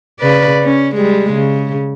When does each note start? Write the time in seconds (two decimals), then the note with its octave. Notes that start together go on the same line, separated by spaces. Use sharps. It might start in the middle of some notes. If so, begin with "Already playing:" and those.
0.19 C#3 B4 D5
0.63 C#4
0.95 G3 G#3
1.33 C#3